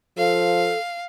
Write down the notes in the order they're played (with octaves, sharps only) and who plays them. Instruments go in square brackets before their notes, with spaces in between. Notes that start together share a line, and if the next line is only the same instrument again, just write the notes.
[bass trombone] F3 [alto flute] A4 [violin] F5